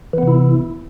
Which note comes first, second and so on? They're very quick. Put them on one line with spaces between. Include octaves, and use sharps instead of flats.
E3 B3 C3 E4